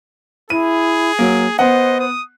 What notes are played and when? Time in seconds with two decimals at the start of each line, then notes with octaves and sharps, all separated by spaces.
0.50 E4 G#4 D#7
1.19 F#3 A#3
1.59 B3 C5 D#5 F#5
2.00 D#6